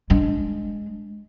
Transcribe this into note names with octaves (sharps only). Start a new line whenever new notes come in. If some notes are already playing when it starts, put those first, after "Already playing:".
G#3 D4